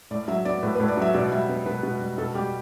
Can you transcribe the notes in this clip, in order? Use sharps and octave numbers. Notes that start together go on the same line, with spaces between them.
A2 D5
F#3 E5
B3 D5
A2 B4
B4
A2
D5
F#3 E5
B2 D5
G3 E5
B3
B2 B4
B2
G3
B2 A4
G3 G4